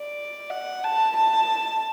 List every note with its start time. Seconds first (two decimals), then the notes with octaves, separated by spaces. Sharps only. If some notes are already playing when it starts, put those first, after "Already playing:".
Already playing: D5
0.50 F#5
0.84 A5
1.17 A5